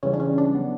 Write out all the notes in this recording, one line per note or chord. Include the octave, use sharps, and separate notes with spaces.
C#3 E3 G3 C#4
D4
C#4
D4
F#3 B3